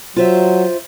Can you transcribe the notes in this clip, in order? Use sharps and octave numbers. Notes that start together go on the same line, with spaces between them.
F#3 F4 C5 E5